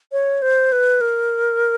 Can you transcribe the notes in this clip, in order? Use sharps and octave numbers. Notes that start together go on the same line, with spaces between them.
C#5
C5
B4
A#4